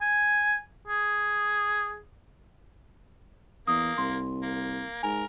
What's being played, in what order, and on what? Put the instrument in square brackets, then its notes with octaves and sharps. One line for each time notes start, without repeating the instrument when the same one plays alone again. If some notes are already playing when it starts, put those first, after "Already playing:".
[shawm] G#5
G#4
[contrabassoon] E2 [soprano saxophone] A#3 [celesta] D#6
[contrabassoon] C2 [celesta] C6
[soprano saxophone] A#3
[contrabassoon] G#2 [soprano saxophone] A#4 [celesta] G#5